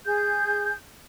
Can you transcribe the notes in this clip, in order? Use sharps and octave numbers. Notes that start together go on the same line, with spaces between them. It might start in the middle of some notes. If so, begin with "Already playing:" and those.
G#4 G6